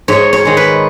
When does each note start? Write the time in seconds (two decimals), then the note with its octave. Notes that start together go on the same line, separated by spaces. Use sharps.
0.08 G#2 C#5
0.33 C#5
0.45 D#3 G#3
0.57 B4